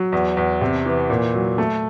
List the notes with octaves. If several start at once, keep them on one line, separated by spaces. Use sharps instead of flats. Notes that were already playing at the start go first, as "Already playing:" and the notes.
Already playing: F#3
E2
E2
C3
E3
A#2
F#3
A3